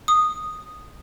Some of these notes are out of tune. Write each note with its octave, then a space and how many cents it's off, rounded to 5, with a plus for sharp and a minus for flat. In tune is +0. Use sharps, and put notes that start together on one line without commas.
D#6 -5